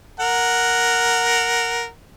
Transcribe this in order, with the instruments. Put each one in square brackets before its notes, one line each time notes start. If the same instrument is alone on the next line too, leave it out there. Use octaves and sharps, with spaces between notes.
[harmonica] A#4 F#5